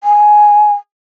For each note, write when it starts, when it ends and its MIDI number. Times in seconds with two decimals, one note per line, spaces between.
0.04 0.73 80